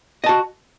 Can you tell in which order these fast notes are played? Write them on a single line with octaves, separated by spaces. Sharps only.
D#5 A5 F#4